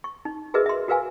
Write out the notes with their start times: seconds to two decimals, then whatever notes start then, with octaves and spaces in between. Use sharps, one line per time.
0.04 C#6
0.25 D#4
0.54 F#4 G#4 A#4 B4 D#5 E5
0.66 E5 C6
0.88 F#4 A#4 B4 F5 G#5